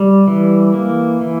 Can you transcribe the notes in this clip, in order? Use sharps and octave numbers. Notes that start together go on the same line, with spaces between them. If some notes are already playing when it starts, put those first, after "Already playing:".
Already playing: G3
E3
A#3
E3